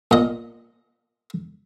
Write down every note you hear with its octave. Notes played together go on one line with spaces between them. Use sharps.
A#2 D#5